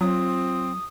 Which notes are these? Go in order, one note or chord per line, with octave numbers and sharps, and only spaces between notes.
F#3 C4 F4 D#6